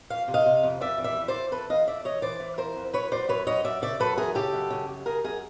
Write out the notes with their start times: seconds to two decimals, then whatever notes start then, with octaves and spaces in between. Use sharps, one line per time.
0.10 F2 F5
0.28 C3
0.34 D#5 F5
0.46 C3
0.63 F2
0.81 F2 D5 E5
0.98 E3
1.04 D5 E5
1.17 F2
1.28 C5 D5
1.34 F2
1.51 F2 A4 B4
1.70 E3 D#5 F5
1.87 F2 D5 E5
2.05 E3 C#5 D#5
2.22 E3 C5 D5
2.40 E3
2.58 F2 A#4 C5
2.76 F2
2.93 F#2 B4 C#5
3.12 F#2 C5 D5
3.29 F#2 B4 C#5
3.47 F#2 C#5 D#5
3.64 F#2 D5 E5
3.82 C#3 D5 E5
4.00 F#2 A4 B4
4.17 E3 G#4 A#4
4.35 C#3 G4 A4
4.53 F#2
4.70 C#3
4.88 F#2
5.06 C#3 G#4 A#4
5.24 F#2 G#4 A#4